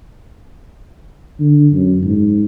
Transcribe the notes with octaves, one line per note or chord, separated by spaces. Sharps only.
D3
F#2
G#2